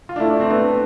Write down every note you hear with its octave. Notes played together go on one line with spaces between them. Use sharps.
F4
D4
A3 E4
D4
C4
B3